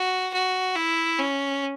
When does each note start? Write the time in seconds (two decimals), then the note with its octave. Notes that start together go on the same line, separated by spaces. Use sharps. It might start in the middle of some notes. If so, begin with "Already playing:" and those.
Already playing: F#4
0.34 F#4
0.76 E4
1.19 C#4